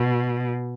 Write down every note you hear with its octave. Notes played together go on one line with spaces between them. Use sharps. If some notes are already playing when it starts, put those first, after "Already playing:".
Already playing: B2